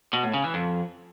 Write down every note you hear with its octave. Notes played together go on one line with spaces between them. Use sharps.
B2
A2
C#3
E3
F2